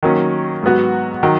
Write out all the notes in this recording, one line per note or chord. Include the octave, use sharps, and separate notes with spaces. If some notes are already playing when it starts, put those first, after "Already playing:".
D#3 F#3 A#3 C#4
G#2 F#3 B3 F#4
D#3 F#3